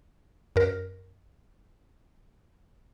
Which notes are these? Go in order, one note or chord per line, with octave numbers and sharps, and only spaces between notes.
F#2 A#4